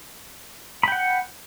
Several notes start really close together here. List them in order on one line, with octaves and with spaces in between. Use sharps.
B5 G5 F#5